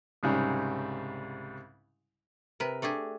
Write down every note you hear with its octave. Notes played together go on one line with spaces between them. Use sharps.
C2 G#2 C#3 G3
C3 A#4 B4
A3 D4 G4 G#4